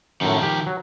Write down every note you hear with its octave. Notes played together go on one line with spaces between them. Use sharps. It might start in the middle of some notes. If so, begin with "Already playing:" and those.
F#2 A2 D#3 F3
G4
F#3